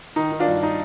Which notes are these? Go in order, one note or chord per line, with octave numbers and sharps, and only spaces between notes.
D#3 D#4
D#3
D4 F4
G2
D#4